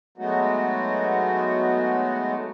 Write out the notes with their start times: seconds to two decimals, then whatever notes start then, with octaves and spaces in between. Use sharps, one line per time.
0.18 F#3 G#3 A3 B3 D#4 F#4